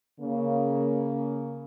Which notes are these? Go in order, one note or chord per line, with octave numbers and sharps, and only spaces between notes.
C#3 A#3